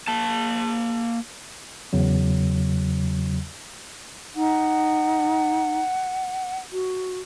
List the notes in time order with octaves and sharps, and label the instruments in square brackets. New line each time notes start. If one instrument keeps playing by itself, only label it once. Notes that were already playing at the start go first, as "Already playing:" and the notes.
[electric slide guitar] A#3 A5
[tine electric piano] E2 C#3 F#3
[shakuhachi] D#4 [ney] F#5
[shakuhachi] F#4